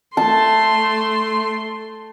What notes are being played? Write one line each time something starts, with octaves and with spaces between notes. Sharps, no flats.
A3 A5 C6